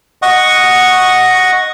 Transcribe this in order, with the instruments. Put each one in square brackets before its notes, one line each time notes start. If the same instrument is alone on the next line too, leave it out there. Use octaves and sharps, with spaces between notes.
[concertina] D#5 F#5 C#6